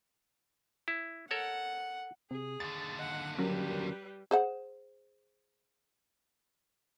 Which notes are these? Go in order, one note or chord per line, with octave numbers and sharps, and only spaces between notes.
E4
A4 A#4 C#5 F#5
C3 G#4
D#2 D3 A6
D#5 F#5
F#3 G3 C#4 A#4 B4
G#4 C5 F#5